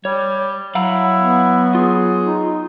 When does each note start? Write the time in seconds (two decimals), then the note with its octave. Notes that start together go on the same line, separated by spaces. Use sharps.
0.05 G3 C#5
0.75 F#3 E4 F5 F#5 A#5
1.19 B3
1.75 F4 G#4
2.23 D#4